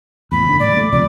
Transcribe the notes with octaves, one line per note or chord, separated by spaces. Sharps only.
E2 A2 B5
F#1 D3
A2 D5
G3 A3
D2 C3 F3 D5